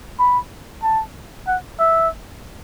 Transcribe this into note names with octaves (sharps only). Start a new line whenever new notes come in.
B5
A5
F#5
E5